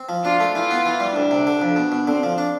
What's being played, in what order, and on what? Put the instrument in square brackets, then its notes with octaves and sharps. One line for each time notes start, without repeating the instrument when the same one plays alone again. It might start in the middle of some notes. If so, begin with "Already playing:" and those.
Already playing: [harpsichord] C4
F3
[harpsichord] D4 [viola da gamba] F4
[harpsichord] A3
[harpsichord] E3 [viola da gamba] F4
[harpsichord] B3
E3
G3
[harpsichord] D2 [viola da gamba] D4
[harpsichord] C3
D3
F2
B2
B2
[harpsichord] D3 [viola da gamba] C4
[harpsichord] F3
D4